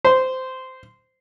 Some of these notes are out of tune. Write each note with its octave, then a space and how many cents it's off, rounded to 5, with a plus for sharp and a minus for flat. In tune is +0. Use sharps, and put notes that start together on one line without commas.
C5 -15